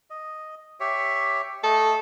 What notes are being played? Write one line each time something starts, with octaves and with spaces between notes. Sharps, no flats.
D#5
G4 C#5 E5
A3 A4 D#5